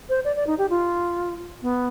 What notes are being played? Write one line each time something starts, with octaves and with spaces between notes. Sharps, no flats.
C5
D5
D5
D#4
G4
F4
B3